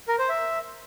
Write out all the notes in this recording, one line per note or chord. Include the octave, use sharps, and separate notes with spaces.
A#4
C5
E5